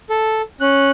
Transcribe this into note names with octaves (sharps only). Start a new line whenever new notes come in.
A4
C#4 F#6